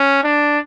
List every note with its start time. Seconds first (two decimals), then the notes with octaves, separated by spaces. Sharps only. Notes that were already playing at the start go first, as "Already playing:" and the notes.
Already playing: C#4
0.24 D4